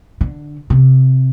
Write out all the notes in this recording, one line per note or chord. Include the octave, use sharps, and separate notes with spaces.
D3
C3